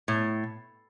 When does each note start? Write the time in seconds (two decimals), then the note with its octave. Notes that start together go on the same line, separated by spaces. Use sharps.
0.08 A2